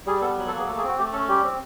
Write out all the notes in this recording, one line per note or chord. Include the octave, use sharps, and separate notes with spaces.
G3 G#4
B3 A4
F#3
A4
A#3 G#4
A3 A4
G#4
C4 F#4
A3 G4
C#4 A4
G3 G4
C4